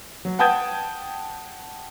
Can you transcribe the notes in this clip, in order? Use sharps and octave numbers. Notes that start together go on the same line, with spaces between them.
F#3
F#5 G5 A5 D#6 G6 G#6